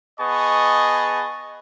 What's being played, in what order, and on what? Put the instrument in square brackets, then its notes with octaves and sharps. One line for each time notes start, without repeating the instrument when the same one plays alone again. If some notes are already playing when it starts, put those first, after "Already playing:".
[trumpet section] B3 G#4 D#5 A5 C#6